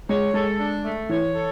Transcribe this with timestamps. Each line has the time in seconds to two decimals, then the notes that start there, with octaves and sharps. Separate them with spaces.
0.09 G#3 C#5
0.34 G#3 A4
0.59 D4
0.84 A3
1.09 E3 C#5
1.34 A4